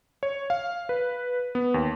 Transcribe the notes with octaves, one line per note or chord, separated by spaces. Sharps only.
C#5
F5
B4
B3
D#2